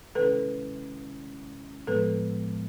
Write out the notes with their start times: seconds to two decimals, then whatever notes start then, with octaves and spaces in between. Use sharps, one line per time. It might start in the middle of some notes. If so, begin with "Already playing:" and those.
0.15 C3 D#3 G#3 C#4 E4 A4 B4
1.87 A2 F3 G#3 B3 A4 B4